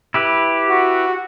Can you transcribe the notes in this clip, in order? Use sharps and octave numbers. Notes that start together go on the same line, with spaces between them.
E4 G4 B4
F#4